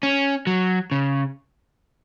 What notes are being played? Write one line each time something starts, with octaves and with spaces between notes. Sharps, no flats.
C#4
F#3
C#3